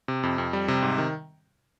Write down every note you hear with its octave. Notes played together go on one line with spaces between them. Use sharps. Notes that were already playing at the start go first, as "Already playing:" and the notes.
C3
F2
F2
G3
C3
G#2
D#3